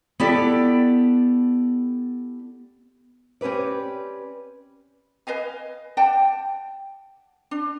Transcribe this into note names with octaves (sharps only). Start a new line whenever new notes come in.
B3 E4 G4 A4 D5
C4 C#4 G4 B4 D5
B4 D#5 F5 G#5
D5 F#5 G5 A5
D4